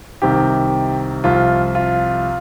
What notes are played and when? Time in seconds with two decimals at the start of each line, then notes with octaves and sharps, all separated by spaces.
0.22 C2 C3 D#3 G4
1.24 C2 C3 F3 F4
1.75 F4